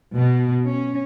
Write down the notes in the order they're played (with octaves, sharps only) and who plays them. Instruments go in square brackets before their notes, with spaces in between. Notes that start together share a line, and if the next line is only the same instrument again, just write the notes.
[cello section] B2
C#4